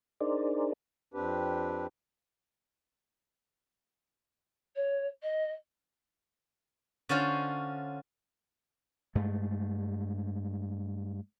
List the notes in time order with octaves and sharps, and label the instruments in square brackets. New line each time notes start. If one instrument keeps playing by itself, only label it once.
[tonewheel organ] D4 D#4 G#4 A#4 C5 D5
[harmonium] F2 C4 D4 G4 B4
[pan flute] C#5
D#5
[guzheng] D3 C#4 F4 C5
[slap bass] G2 G#3 A3